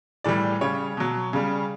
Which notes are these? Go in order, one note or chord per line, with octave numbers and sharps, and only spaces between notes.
A2 E3 G3 D5
C#3 G3 C#5
B2 F#3
C#3 G3